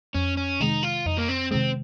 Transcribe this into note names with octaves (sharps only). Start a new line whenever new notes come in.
F2 C#4
C#4
C3 D#3 G#3 D#4
F4
F2 D#4
A#3
C4
C3 D#3 G#3 C4